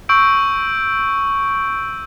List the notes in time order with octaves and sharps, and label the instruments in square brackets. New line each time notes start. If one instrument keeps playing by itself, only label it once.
[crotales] C#6 E6 G6 D7